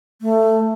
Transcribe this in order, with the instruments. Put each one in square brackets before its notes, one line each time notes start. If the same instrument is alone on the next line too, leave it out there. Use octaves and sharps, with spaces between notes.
[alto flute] A3